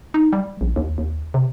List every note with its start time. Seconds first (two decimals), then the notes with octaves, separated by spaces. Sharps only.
0.14 D#4
0.33 G3
0.61 A#1
0.76 D#2
0.98 D#2
1.34 C3